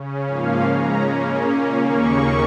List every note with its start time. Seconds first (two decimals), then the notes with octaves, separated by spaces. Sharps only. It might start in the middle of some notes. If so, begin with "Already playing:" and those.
Already playing: C#3 C#4
0.24 G#2 F3 A#3 C#4 F5
0.62 C#3 G#3 C#4 A#5
1.01 C#3 A#3 C#4
1.40 A#2 A#3 C#4
1.78 D#2 C#3 A#3 C#4 C#6